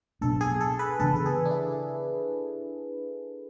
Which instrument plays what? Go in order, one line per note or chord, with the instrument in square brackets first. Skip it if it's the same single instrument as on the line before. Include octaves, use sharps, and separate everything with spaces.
[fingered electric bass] B2 F#3 B3 D4 [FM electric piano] A4
[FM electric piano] G#4
A4
B4
[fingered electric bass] C#3 E3 B3 D4 [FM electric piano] A4
[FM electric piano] A4
G#4
D4
E4